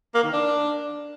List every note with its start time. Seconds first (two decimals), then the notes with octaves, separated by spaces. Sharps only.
0.15 A#3
0.24 D#3
0.33 D4